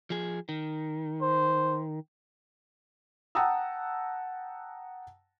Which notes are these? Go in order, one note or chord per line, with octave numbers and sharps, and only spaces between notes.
F3 G#4
D#3
C5
F#5 G5 A5 A#5 D#6 E6